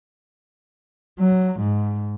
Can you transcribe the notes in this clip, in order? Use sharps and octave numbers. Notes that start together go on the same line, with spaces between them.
F#3
G#2